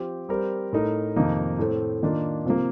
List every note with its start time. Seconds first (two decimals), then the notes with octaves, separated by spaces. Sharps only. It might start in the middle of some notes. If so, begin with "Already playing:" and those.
Already playing: F3 C4 G4 C5
0.29 G3 C4 G4 A#4
0.73 A2 A3 D#4 A#4
1.16 F2 C3 D#3 A#3 D#4
1.59 A2 A3 C4
2.03 D#3 A#3 D4 F4
2.46 C3 F3 A#3